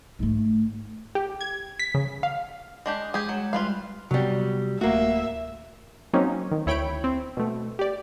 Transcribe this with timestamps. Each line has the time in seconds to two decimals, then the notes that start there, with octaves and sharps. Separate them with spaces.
0.19 G#2 A3
1.15 G4
1.41 G#6
1.80 B6
1.95 C#3
2.23 F5
2.86 G#3 D4 G4
3.02 D#6
3.14 G#3 G4 G#4
3.29 F#3 C#5 E7
3.53 G3 F4 B4 F5
4.11 C3 F#3 G3 B3
4.81 D1 A3 A#3 F#4 E5
6.13 F#3 A#3 C4 C#4 D#4
6.51 D#3
6.66 D2 E4 C#5 G5 B5 D7
7.04 C4
7.37 B2 A3
7.79 G4 D5